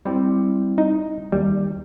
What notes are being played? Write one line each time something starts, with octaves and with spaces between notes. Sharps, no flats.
G3 C4 E4
D#4
D#2 G3